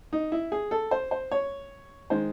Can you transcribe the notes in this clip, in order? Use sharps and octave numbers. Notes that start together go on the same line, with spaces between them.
D#4
E4
G#4
A4
C5
C5
C#5
D#3 G#3 C5